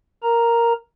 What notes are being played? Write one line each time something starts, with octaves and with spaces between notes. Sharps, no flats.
A#4 A#5